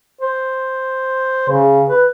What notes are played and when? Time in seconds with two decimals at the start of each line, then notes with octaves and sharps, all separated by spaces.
0.21 C5
1.49 C#3
1.89 B4